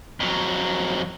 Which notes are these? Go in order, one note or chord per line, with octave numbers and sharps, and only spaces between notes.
F2 F#3